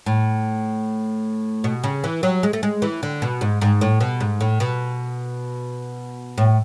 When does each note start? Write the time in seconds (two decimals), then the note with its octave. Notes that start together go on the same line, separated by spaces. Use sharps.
0.06 A2
1.64 B2
1.84 C#3
2.04 E3
2.23 F#3
2.43 G#3
2.53 A3
2.63 G#3
2.82 E3
3.03 D3
3.22 B2
3.41 G#2
3.61 G#2
3.81 A2
4.01 B2
4.20 G#2
4.41 A2
4.60 B2
6.38 A2